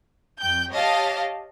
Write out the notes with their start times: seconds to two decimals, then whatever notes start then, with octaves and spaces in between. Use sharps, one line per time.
0.39 F2 G5 G6
0.71 G4 C#5 D#5 F5 A5